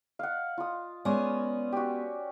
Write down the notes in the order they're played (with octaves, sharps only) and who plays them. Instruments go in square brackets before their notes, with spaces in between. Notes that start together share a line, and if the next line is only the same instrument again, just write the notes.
[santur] F5 F#5
F4 D#6
[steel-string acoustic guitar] G#3 B3 [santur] C#4 D5 C6
[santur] F#4 G4